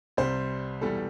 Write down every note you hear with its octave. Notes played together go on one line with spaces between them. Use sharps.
C2 C3 G3 C5
E1 E2 E3 G3 A4